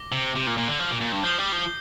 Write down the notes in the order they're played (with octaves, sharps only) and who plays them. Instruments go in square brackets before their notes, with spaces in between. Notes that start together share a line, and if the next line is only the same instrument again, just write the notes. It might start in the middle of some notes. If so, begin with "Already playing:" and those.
Already playing: [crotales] D6 A#6 G7
[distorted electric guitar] C3
C3
A#2
A#2
D3
F3
A#2
A#2
G2
[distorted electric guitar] F3 [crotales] G6 C7 G7
[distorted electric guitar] G3
F3